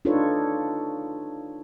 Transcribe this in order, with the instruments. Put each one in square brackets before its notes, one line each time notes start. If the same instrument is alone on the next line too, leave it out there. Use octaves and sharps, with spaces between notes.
[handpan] D4 D#4 F4 A4 B4 C#5